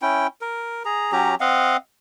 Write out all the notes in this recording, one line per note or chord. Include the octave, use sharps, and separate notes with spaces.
C#4 E4 G5
A#4
G#4 A#5
F#3 C#4 G4 A#5
C4 D#5 F5 F#5